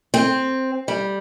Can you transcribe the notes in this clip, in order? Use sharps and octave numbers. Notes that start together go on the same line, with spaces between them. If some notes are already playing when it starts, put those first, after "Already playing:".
C4
G3